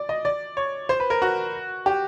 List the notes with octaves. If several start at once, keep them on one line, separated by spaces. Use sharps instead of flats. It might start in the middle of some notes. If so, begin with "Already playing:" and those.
Already playing: D5
D#5
D5
C#5
C5
B4
A#4
F#4
G4